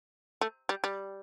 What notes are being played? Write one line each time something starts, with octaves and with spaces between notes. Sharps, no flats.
A3
G3
G3